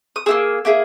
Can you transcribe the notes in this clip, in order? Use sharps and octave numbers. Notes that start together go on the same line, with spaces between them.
D#6
A#3 E4 G#4 E6
A#3 E4 G#4